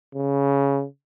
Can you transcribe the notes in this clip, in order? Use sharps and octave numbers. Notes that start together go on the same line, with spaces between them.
C#3